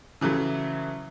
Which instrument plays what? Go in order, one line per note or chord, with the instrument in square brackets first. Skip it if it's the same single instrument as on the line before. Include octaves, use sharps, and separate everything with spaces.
[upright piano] C#3 E3 F#3 A3